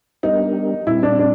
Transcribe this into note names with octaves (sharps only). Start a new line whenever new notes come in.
G3 B3 D4 D#4 G4 A#4
A#2 G3 C4 E4
D4
D4